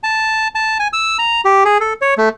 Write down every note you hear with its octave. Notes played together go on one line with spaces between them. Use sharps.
A5
A5
G#5
E6
A#5
G4
G#4
A4
C#5
A3